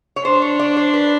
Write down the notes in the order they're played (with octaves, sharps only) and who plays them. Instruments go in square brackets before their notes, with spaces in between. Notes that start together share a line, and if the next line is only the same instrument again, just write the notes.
[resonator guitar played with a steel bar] C#5
[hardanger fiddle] D4 [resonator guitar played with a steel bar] C5
[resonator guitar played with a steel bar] C#5
D5
C5
B4